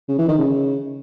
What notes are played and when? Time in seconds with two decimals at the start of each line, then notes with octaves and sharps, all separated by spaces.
0.08 C#3
0.18 E3
0.28 D#3
0.38 C#3